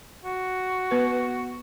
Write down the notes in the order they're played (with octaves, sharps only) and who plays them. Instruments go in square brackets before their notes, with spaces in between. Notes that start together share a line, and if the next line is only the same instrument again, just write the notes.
[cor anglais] F#4
[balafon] B3 B4